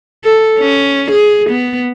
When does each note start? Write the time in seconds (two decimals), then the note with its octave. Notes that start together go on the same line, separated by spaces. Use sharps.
0.24 A4
0.59 C#4
1.12 G#4
1.50 B3